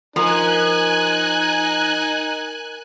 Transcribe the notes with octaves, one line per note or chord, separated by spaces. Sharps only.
F3 D#4 A#4 G#5 F#6